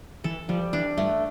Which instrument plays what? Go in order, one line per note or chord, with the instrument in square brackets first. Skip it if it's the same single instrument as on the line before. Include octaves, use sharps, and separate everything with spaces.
[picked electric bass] E3 [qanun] A4
[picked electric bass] F3 [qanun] G3
[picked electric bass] E3 [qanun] D4
[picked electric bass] G2 [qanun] A3